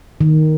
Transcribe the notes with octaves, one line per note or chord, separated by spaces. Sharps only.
D#3